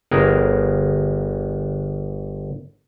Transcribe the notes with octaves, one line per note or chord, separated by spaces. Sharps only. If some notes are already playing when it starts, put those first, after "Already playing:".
G1 G#4 A#4